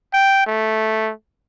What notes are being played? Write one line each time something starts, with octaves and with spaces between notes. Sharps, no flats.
G5
A3